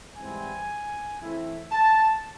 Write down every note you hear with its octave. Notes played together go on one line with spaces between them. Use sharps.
G#2 E3 G3 C4 E4 G#5
E3 A3 C4 E4
A5